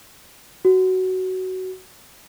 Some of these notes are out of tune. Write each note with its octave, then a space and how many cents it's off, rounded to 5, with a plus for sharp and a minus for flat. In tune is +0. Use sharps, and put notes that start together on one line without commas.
F#4 +15